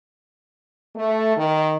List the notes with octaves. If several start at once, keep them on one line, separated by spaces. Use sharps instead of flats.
A3
D#3